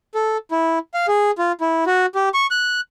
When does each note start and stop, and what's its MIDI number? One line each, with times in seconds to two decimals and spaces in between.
0.15 0.37 69
0.51 0.79 64
0.94 1.06 77
1.08 1.31 68
1.38 1.52 65
1.61 1.84 64
1.87 2.06 66
2.15 2.29 67
2.34 2.47 85
2.51 2.81 90